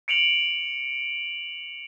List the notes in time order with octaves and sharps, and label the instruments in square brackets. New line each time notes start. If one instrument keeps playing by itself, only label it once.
[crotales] C#7 D7 F7 F#7